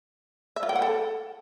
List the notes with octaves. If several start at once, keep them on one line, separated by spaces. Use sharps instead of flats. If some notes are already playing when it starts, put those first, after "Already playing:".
E5
F4
G5
F#5
A4